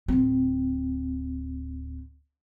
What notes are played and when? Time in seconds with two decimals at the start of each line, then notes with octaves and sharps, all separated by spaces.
0.08 D1 C4